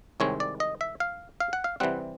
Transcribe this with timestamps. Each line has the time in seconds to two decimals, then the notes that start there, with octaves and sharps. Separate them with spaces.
0.20 C2 C3 D#3 G#3 C4 C#5
0.40 D5
0.60 D#5
0.81 E5
1.00 F5
1.40 F5
1.53 F#5
1.64 F5
1.80 C3 E3 G3 C4 F#5